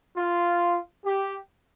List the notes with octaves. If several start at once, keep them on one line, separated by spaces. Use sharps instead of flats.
F4
G4